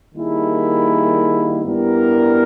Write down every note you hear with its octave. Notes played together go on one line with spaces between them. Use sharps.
D#3 G3 A#3 E4 G#4
G2 G3 B3 E4 A#4